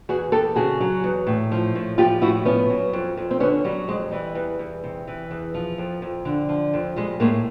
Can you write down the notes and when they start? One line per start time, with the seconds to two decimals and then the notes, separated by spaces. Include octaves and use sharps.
0.09 E2 F#4 G#4
0.32 E2 G4 A4
0.56 C#3 F#4 G#4
0.80 F#3
1.04 E2
1.27 A2
1.52 F3
1.75 A2
1.98 F3 F4 G4
2.22 A2 E4 F#4
2.45 F3 B3 C#4
2.70 F#3
2.93 F2
3.17 F2
3.31 C4
3.40 D3 B3 C#4
3.64 F#3 G3
3.88 F2 G#3
4.11 E3 G3
4.35 E2
4.59 E2
4.84 C3
5.07 E3
5.31 E2
5.54 F3
5.78 F2
6.02 F2
6.25 D3
6.49 F3
6.74 F2
6.96 G3 G#3
7.20 A2 G#3 A#3